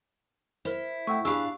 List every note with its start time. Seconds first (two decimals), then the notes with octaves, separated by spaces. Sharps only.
0.65 E4 A#4 C5
1.07 A3 F#5 G5 C#6 E6
1.25 D4 G4 G#4 F5 B5 C#6 E6 F#6